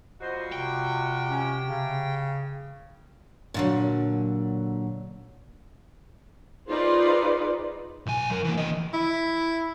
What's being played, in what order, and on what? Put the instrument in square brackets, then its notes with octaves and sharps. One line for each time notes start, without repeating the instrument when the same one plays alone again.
[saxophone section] F2 G3 F#4 [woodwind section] C5 D#5
[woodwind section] C3 [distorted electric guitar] G5
[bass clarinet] C#4
C#3
[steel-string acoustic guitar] A#2 D3 F#3
[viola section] D#4 F4 G#4 B4 C5 D5
[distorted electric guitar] B1 G#5
F#2 A#4
E3 A#3
E3 D#5
[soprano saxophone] E4